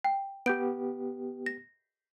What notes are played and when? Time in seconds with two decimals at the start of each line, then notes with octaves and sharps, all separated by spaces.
0.04 G5
0.46 B3 G4 G6 D7
1.46 A#6